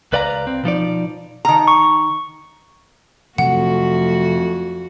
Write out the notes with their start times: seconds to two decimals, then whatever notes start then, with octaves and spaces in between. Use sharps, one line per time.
0.13 C#2 B4 D5 F5 G5 A#5
0.47 C4
0.64 B2 F3 D#4 D5
1.45 D#3 A#5
1.68 C#6
3.38 F2 C3 F3 F#3 A3 F#4 F#5